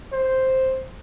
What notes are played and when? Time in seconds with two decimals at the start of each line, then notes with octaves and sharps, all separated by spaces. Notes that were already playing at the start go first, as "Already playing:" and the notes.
0.13 C5